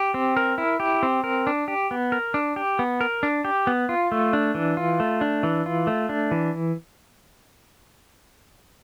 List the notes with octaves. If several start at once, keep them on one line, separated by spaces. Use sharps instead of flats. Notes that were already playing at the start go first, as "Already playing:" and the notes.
Already playing: G4
C4
A#4
E4
G4
C4
A#4
D4
G4
B3
A#4
D4
G4
B3
A#4
D4
G4
B3
F4
A3
D4
E3
F4
A3
D4
E3
F4
A3
D4
E3